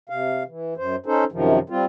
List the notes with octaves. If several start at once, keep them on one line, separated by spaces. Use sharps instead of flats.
C3 F5
E3
F#2 C5
C#4 D#4 A4 C5
F#2 C3 D#3 F3
G3 C4 F4